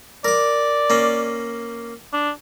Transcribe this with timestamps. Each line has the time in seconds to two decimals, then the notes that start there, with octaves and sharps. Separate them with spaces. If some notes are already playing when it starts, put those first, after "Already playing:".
0.24 A#4 D5 D6
0.90 A#3 C#4
2.13 D4